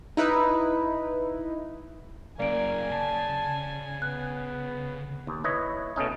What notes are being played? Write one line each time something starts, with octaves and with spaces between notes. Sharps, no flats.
D#4 E4 B4
F#2 C#3 A#3 D5 G#5 D7
C#3 A5
B3 F#6
D#2
E4 B4 C#5 D#5
B2 A3 C#4 D#4